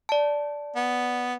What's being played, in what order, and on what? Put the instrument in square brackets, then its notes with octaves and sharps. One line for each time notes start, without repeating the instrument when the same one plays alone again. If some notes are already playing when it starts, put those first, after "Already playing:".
[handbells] D5 A5
[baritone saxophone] B3